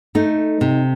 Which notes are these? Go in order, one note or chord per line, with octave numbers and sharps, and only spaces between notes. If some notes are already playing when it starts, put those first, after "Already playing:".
A3 D#4
C3